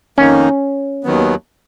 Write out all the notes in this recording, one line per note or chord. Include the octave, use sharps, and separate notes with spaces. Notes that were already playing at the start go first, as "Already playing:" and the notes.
F2 D#3 A#3 C#4 D#4
D#2 D#3 F#3 B3